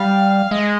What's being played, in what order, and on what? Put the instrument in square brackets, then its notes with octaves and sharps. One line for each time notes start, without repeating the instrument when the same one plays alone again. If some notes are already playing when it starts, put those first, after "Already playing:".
Already playing: [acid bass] G3 [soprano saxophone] F5
[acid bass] G#3 [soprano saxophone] D#5